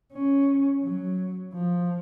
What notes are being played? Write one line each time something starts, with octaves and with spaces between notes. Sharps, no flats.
C#4
F#3
F3